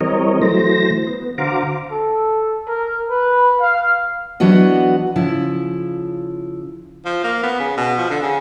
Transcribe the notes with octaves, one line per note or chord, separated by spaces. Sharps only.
E3 G3 C4 A#4 C#5 D#5
E3 F#3 A3 C5 A#6
B3
D3 F#4 C5 F5 A#5 D6
A4
A#4
B4
F5
E3 F#3 B3 D4 F#4 D#5
C#3 F3 E4
F3
A#3
B3
C#3
B2
F3
D3
C#3